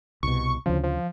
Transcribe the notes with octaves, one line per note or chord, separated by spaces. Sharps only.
C2 B2 C#6
D2 C#3 F3
F3